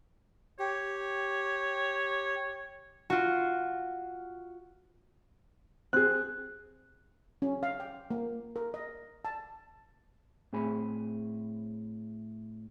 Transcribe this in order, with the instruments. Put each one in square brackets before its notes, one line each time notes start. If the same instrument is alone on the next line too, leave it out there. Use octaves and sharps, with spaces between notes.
[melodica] G4 [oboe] C#5
[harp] F4 F#4
[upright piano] C4 G#4 [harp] F#6
[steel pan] C#4
F5
G5
A#3
A#4
D#5
A5
[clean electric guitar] A2 C4 G#4 G#5 B5